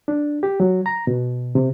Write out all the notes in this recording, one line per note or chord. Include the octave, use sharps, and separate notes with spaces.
D4
G4
F#3
A#5
B2
C3